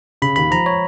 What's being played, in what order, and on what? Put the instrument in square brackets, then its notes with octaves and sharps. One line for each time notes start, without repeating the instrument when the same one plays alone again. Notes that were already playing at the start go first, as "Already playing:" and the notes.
[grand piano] C#3 [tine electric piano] B5
[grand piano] D#2 [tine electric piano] B5
[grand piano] F3 [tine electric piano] A#5
[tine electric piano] C#5